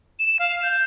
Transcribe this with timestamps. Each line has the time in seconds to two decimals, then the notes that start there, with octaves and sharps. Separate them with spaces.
0.19 E7
0.39 F5
0.63 G6